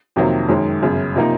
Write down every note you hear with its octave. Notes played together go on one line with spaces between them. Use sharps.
F2 C3 D#3 F#3 A#3
F#2 D#3 G#3 C#4
G1 F#2 C#3
C3 F3 A#3 D#4